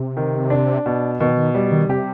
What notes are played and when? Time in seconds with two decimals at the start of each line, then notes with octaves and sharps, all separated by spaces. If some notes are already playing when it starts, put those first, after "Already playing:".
Already playing: C3
0.17 D#3
0.50 D4
0.86 B2
1.20 B2 D#3
1.37 D#3
1.55 G3
1.72 D#3
1.89 C3 G4